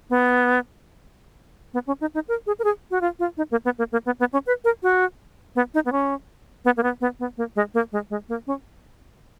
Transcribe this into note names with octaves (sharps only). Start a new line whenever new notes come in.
B3
B3
C#4
D#4
D#4
A#4
G#4
A#4
G#4
F#4
F4
F4
D#4
A#3
B3
A#3
A#3
B3
B3
C#4
B4
A#4
F#4
B3
D#4
B3
C#4
B3
A#3
B3
B3
B3
A#3
G#3
A#3
G#3
G#3
A#3
C#4